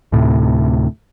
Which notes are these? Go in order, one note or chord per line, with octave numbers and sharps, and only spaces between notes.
D2 A2 C3